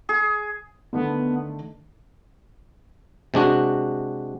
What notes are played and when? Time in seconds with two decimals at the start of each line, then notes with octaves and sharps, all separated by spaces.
0.09 G#4
0.93 D3 D#3 A3 B3
3.34 C3 G#3 D4 F#4